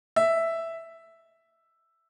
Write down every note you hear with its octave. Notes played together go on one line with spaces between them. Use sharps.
E5